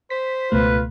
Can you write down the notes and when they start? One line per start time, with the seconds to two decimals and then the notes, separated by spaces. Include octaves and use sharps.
0.10 C5 B6
0.52 C#2 B2 A3 F4 B4